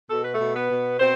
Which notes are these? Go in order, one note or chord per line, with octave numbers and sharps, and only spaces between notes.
B2 A4
B4
A3 A4
B2
B3 B4
B2
B2 C4 C5